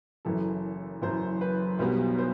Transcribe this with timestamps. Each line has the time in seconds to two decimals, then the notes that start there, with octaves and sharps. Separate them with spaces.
0.25 F#1 F#2 E3 A4
1.02 F#1 F#2 E3 C5
1.41 B4
1.79 B1 B2 G3 B3 C5
2.19 C5